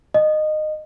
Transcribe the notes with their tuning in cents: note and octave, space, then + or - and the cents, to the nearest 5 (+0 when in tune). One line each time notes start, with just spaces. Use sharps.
D#5 -20